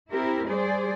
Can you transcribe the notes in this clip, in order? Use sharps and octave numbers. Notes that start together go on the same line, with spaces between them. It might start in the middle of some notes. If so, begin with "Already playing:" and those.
C4 E4 G4 A#4
G3 G#4 C5 D5